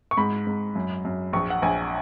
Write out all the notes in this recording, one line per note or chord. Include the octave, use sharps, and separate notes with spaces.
C#6
G#2 B5
G#2
F#2
F#2
A#1 C#6
F#5
A#1 G#5